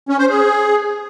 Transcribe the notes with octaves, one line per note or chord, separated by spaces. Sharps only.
C#4
C5
G#4